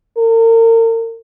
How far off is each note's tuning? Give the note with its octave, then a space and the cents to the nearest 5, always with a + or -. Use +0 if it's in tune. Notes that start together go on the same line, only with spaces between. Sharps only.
A#4 -40